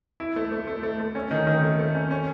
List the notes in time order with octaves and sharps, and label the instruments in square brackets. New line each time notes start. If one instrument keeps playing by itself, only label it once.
[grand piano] E4
A3
A3
A3
A3
A3
C#4
D#3
D#3
A3
A3
C#4
C#4